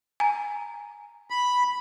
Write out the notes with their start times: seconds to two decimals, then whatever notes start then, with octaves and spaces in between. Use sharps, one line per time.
0.20 G#5 A#5
1.30 B5